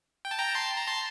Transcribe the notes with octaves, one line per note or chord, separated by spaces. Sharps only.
G5
A5
G5 A#5
A5 C6
A#5
A5 C6